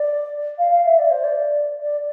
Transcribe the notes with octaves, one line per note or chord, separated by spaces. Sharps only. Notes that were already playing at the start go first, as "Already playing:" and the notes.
Already playing: D5
F5
F5
E5
D5
C5
D5
D5